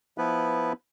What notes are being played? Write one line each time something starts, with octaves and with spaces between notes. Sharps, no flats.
F3 B3 E4 B4